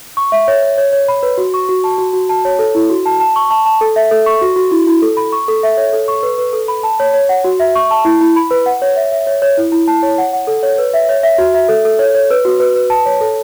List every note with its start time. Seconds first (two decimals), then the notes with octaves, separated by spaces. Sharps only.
0.17 C#6
0.32 E5
0.48 C#5
0.63 C#5
0.78 C#5
0.93 C#5
1.08 B5
1.23 B4
1.38 F#4
1.54 C#6
1.69 F#4
1.84 A5
1.98 F#4
2.13 F#4
2.29 A5
2.45 C#5
2.59 A4
2.75 E4
2.90 F#4
3.06 A5
3.20 A5
3.36 C#6
3.50 A5
3.66 A5
3.81 A4
3.96 E5
4.11 A4
4.26 C#6
4.42 F#4
4.56 F#4
4.71 E4
4.87 E4
5.02 A4
5.17 B5
5.32 C#6
5.48 A4
5.63 E5
5.77 C#5
5.93 A4
6.08 C#6
6.23 B4
6.38 B4
6.53 A4
6.68 B5
6.83 A5
7.00 C#5
7.14 C#5
7.29 F#5
7.44 F#4
7.60 E5
7.75 C#6
7.91 A5
8.05 E4
8.21 E4
8.36 B5
8.51 B4
8.66 F#5
8.82 C#5
8.96 E5
9.12 E5
9.27 C#5
9.42 C#5
9.57 E4
9.72 E4
9.88 A5
10.03 C#5
10.18 F#5
10.33 F#5
10.47 A4
10.63 C#5
10.78 B4
10.94 E5
11.09 C#5
11.23 E5
11.38 F#4
11.54 E5
11.69 A4
11.85 A4
11.99 C#5
12.15 C#5
12.30 B4
12.45 F#4
12.60 B4
12.76 B4
12.90 A5
13.06 C#5
13.21 A4